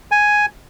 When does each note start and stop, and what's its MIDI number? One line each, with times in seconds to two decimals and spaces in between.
0.11 0.46 80